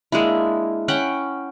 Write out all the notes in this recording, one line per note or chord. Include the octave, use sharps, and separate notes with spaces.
G#3 A#3 D4 E4
C#4 F#5 G5 B5